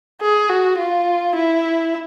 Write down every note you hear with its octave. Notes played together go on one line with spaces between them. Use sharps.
G#4
F#4
F4
E4